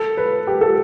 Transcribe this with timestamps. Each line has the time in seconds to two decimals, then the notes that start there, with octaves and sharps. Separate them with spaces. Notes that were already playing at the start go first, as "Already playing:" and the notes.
Already playing: A4
0.17 B4
0.47 G4
0.61 A4